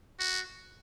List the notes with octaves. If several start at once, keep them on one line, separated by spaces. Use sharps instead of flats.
F#4